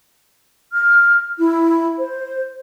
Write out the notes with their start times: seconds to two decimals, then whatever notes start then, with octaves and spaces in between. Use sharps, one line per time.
0.72 F6
1.38 E4
1.98 C5